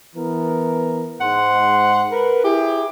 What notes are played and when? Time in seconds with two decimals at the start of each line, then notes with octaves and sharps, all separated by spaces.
0.16 E3 B3 A#4
1.21 G#2 F#5 C6
2.11 A#4 B4
2.44 E4 G4 G#4